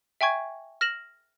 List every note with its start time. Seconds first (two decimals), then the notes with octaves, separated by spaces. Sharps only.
0.21 E5 G5 G#5 C#6 G#6
0.81 F6 A#6 E7 F#7